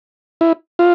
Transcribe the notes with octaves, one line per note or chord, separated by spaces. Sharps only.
E4
F4